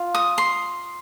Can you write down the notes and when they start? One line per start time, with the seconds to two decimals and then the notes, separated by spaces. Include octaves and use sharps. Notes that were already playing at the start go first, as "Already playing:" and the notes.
Already playing: F4
0.14 D#6
0.38 C6